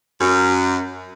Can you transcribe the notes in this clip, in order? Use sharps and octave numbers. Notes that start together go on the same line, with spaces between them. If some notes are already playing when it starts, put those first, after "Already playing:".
F#2